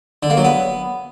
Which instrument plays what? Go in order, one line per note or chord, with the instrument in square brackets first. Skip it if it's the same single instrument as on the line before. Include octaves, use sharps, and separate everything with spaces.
[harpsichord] D3
A#3
F#3
B3